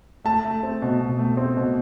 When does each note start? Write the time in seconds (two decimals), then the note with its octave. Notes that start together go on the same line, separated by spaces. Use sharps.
0.24 A3 A5
0.44 A3
0.63 C4
0.82 B2
1.01 B2
1.19 A3
1.37 C4
1.57 B2